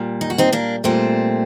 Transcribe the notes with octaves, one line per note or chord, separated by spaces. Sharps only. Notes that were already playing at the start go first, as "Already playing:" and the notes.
Already playing: A#2 G3
D#4
F#4
C4 D#4
A#3 D4
A#2 G3 A3 C4